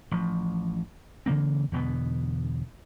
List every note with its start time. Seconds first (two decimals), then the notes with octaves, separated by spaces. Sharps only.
0.11 A1 F3
1.26 C#3 E3 A#3 C4
1.72 E2 B2 D3 B3